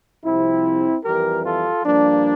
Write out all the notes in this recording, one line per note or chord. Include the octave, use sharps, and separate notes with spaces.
C2 C3 F3 C4 E4
F2 E3 G3 G4 A#4
F4 A4
G2 F3 A#3 D4